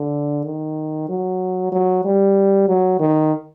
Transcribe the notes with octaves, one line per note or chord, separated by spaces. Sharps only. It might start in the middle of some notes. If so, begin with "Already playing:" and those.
Already playing: D3
D#3
F#3
F#3
G3
F#3
D#3